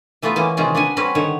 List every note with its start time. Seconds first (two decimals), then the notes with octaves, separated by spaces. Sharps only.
0.22 E3 A3 B3 F4 B4
0.36 E3 A#3 C#4
0.57 C3 D#3 G#3 C#4 F4
0.75 D4 B4 F#5 G#5
0.97 G3 C4 C#4 F#4 B4
1.15 D3 D#3 C#5 F#5